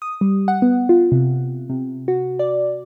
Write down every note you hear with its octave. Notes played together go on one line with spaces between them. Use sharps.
D#6
G3
F#5
B3
F4
C3
C3
F#4
D5